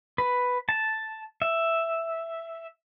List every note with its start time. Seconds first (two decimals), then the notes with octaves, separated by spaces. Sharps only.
0.18 B4
0.69 A5
1.42 E5